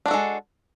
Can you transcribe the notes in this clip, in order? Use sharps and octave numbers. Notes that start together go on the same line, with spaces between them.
G#3 D4 F#4 A4